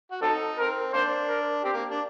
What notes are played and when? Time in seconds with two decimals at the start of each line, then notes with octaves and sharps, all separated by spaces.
0.12 F#4
0.22 F#3 C4 D#4 A4
0.57 C4 A#4
0.93 A#3 D4 C5
1.29 A#4
1.64 C4 G4
1.73 A#3
1.92 D4